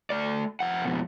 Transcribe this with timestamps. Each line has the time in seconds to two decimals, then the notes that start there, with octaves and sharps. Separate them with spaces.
0.10 A3 D5
0.60 F2 F#5
0.85 F2 B2